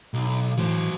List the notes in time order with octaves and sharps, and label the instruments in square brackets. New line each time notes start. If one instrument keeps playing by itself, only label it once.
[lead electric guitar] B1
[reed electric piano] A2 E3 [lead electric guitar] F#3 C5